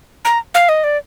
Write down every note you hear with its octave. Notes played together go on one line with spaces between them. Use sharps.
A#5
F5
D#5
D5